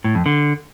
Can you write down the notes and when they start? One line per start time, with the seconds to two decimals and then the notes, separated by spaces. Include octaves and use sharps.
0.04 A2
0.15 F2
0.26 D3